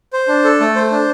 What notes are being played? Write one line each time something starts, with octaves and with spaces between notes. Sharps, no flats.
C5
D4
A4
A3
C5
D4